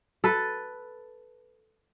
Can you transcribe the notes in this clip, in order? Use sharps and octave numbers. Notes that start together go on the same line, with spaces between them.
A4 B4